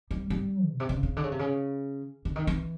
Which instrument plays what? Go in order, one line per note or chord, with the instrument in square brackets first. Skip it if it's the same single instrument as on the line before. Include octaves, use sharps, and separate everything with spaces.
[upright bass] G3
G3
B2
C3
C#3
C#3
D3
C#3
C3
C#3
D3
D#3
E3